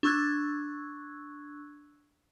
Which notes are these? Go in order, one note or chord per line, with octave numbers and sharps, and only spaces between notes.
D4 C#6 E6 F#6 G#6